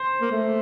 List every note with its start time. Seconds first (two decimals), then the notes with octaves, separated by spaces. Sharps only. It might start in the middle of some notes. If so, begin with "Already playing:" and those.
Already playing: C5
0.21 A#3
0.32 A3